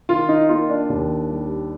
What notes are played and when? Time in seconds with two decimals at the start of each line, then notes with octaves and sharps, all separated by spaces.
0.09 D#3 F4
0.29 D#4
0.49 A#3 F4
0.70 D4
0.89 D#2
1.31 G3